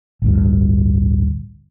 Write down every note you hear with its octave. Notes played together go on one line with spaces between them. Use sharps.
A1 D2 G2